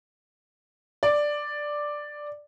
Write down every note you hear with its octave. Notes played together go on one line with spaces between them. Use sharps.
D5